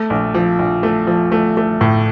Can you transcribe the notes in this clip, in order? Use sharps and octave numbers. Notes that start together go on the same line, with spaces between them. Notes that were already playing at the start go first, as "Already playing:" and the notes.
Already playing: A3
A#1
F3
A#1
A3
F3
A3
A3
A2